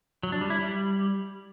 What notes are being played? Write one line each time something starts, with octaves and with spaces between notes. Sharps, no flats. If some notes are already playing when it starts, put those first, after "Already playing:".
F#3
D4
G3
E4
G3